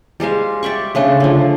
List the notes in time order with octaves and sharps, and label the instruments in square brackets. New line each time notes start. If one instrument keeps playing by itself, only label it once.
[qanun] G3 G#3 C5 F5
D5 E5 G5 C#6
C#3 A3 D4 C5
D3 F3